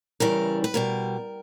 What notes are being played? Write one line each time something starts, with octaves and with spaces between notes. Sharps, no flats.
E2 C#3 E3 G3 A#4
B4
B2 G3 A#4